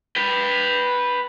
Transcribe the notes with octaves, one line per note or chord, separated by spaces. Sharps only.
B4 G5